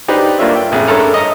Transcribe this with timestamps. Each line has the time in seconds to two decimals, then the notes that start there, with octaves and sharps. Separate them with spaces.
0.08 D4 D#4 G4 B4 C5
0.39 G2 A#3 D4 F4 C#5 E5
0.56 G5
0.72 A1 F2 G#4
0.87 G2 C#4 A4 A#4 A#5
1.14 D#5 E5 A#5